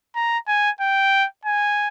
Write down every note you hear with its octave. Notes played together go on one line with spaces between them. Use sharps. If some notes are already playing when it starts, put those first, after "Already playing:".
A#5
G#5
G5
G#5